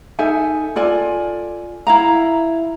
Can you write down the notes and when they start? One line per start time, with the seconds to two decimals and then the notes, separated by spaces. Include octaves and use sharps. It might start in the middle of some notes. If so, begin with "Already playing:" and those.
0.19 D#4 A4 E5 G#5
0.76 F4 A4 D5 G#5
1.87 E4 F5 A#5